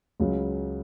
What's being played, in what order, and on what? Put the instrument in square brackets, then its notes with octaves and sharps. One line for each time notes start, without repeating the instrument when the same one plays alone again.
[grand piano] C#2 C#3 F#3